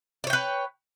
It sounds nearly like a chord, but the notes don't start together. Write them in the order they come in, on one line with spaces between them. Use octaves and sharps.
D5 C#5 G5 B4